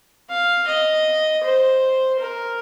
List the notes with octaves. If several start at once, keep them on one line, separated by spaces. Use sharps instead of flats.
F5
D#5
C5
A#4